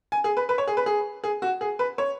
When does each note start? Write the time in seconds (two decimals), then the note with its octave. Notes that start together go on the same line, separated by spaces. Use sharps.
0.12 G#5
0.24 G#4
0.37 B4
0.49 B4
0.58 C#5
0.67 G#4
0.77 B4
0.86 G#4
1.24 G#4
1.42 F#4
1.61 G#4
1.79 B4
1.98 C#5